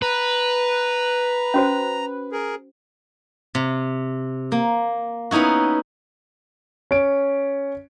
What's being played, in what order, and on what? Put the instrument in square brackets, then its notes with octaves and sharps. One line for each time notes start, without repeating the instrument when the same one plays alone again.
[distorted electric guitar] B4 [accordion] A#5
[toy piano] C#4 F#4 C5
[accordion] G#4 A#4
[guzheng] C3
A#3
B3 C#4 D#4 E4 F#4
[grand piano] C#4 D7